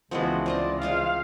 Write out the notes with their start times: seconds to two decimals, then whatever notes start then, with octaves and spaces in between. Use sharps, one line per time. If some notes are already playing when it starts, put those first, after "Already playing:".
0.11 C#2 E3 F3 G#3 B3 C4 F#4
0.46 C4 F4 C5 D5 D#5
0.82 G#3 F4 C5 F5